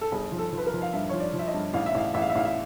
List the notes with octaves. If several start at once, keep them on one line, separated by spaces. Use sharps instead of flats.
A4
G1 G#4
F3
A4
F3
B4
A#4
F3
F5
G2 E5
F3 C#5
D5
F3
E5
D#5
G2
A1 F5
E5
A1 F5
A1 E5
F5
E5
A1 F5
E5